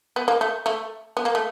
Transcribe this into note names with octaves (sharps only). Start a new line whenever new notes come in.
B3
A#3
A3
A3
B3
A#3
A3